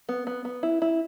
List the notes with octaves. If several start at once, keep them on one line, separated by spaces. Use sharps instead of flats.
B3
B3
B3
E4
E4